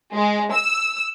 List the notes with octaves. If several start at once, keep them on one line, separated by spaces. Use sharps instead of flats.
G#3
E6